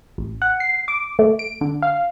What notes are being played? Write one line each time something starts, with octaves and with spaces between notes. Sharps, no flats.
A1
F#5
C7
D6
A3
D7
D3
F5